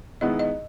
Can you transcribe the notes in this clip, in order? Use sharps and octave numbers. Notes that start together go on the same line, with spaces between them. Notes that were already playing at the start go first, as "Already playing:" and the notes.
D#3 G#3 B3 E4 D#5
D#5